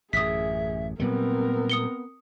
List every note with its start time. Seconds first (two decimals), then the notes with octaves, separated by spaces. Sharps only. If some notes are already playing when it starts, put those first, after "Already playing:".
0.13 A1 F#2 G#4 E5 D#6 B6
1.00 A#2 F#3 G3 B3 C4 A#4
1.70 D#6 C#7 G7